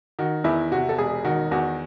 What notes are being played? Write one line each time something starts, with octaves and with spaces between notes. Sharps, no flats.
D#3 F#4
E2 E4
C3 F#4
A4
E1 G#4
D#3 F#4
E2 F#4